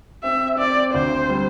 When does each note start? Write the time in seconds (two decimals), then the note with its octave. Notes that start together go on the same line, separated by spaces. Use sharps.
0.23 C4 E5
0.59 C4 D5
0.94 D2 C5
1.29 G3